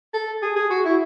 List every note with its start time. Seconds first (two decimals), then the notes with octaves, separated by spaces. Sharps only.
0.14 A4
0.43 G#4
0.56 G#4
0.70 F#4
0.85 E4